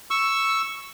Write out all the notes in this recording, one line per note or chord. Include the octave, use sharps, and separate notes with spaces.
C#6 E6